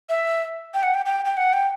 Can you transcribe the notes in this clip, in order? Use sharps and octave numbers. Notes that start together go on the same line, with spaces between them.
E5
G5
F#5
G5
G5
G5
F#5
G5